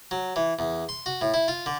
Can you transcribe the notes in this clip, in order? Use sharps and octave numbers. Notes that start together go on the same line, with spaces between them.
F#3
E3
E2
C6
F#4
A2
E4
F4
D3